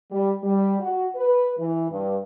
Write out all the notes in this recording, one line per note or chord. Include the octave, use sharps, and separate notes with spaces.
G3
G3
F#4
B4
E3
G2